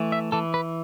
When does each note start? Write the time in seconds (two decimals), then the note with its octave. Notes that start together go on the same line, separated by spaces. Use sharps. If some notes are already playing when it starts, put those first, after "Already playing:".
Already playing: E3 A3
0.12 E5
0.32 E3 A4
0.54 B4